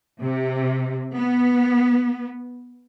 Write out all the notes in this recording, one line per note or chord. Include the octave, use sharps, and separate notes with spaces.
C3
B3